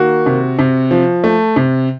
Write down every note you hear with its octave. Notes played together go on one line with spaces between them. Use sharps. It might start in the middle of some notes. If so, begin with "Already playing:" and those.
Already playing: D#3 A#3 F#4
C3
C3
F3
A3
C3